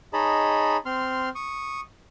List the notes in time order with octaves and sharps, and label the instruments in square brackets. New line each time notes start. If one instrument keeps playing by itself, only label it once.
[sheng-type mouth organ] D#4 G#4 C#5 D#5 A5 B5
C4 C6 F6
C#6 D#6